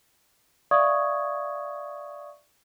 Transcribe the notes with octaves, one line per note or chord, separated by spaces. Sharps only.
D5 E5 F5 C#6 D#6 G#6